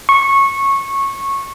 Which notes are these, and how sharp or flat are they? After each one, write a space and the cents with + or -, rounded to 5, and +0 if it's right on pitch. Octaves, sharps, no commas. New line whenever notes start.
C#6 -15